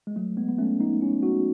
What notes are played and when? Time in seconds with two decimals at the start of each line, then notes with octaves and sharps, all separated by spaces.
0.07 G#3
0.16 F#3 A3
0.37 G#3 B3
0.48 B3
0.58 A3 C#4
0.80 B3 D#4
1.01 C#4 E4
1.23 D#4 F#4